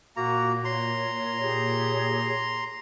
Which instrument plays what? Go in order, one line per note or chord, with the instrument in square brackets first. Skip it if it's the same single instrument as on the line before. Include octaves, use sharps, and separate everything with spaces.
[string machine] A#2 [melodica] A#3 A#5 [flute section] F#4 C#6
[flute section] C#5 [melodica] A#5 C6
[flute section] G4 G#4 C#5